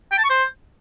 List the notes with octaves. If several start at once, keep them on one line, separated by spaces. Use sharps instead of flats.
G5
A5
C#6
C5